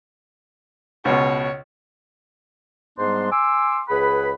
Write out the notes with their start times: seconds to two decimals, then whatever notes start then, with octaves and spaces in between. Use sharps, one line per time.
1.05 C#2 B2 C#5
2.98 G#2 G3 B3 D4 C6
3.32 G#5 C6 D6 E6
3.88 C#2 G#4 B4 F#5 B5